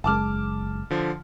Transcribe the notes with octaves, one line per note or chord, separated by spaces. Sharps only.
F#1 G#3 A5 D6 F6
D3 F3